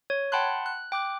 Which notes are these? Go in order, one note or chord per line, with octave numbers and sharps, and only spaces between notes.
C#5
F#5 G5 A5 B5 C6 F#6
F#6
G5 D6 F#6